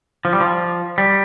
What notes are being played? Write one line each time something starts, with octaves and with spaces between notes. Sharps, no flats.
F3
G3
F3
G3